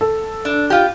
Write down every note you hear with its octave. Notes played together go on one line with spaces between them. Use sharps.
A4
D4
F4 G4